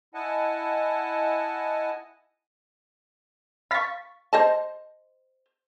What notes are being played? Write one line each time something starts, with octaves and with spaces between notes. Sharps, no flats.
E4 D#5 F#5 G#5 A5
F5 B5 C#6 A6 B6
C5 D#5 A5